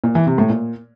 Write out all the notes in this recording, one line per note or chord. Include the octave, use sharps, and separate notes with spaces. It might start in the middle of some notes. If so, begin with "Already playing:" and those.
A#2
E3
C3
A2
A#2